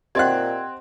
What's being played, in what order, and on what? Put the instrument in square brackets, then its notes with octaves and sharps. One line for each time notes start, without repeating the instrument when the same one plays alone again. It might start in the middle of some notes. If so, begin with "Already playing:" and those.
[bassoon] A#2 [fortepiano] C4 F#6 [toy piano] G4 D#5 F#5 [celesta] G5 G#6